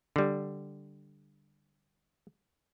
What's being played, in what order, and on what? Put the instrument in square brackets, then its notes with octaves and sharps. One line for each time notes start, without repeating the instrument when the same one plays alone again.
[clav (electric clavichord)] D3 G3